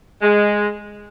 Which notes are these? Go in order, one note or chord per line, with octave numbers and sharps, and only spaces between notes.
G#3